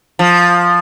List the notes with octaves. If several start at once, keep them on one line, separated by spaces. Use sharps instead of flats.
F3